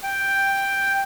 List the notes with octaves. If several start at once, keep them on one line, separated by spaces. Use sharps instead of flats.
G5